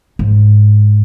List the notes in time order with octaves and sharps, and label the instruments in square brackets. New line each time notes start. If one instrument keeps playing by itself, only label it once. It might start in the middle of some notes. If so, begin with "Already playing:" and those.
[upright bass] G#2